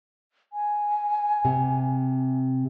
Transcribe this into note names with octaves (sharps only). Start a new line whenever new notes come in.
G#5
C3